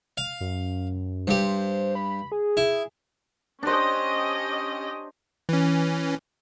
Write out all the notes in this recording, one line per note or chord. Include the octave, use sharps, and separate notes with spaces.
F5
F#2
G2 G4 C5
B5
G#4
E4
C#4 D4 G4 C5 D#5
E3 C#4